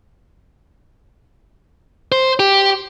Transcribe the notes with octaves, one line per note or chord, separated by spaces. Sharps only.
C5
G4